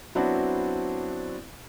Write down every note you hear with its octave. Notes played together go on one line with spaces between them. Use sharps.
F#3 B3 C4 D4 E4 F#4